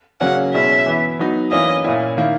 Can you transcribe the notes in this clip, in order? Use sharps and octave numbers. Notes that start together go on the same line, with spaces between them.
C#3 F#3 A#3 C#4 F#5
B2 G#3 C#4 E4 E5
E3 B3 E4
F#3 B3 D#4
E3 A#3 C#4 E4 D#5
A#2 A#3 C#4 E4
D#3 A#3 E4